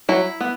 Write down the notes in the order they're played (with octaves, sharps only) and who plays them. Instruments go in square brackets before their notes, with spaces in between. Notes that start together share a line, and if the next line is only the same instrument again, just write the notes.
[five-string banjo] F#3 E4
B3